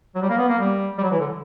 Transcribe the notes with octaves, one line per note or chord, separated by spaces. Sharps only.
F#3
G3
A#3
B3
A#3
G3
G3
F#3
E3
D3